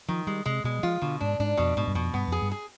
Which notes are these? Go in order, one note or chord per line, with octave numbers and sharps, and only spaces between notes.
D#3 F3
G3 G#3
C3 G#3
B2 G#3
G3
F3 F4
B2 D3
G#2 D4
G#2 D4
F2 B2
G#2 B2
G2
F2 B2
G2 B3
F2
G#4
G2
G#4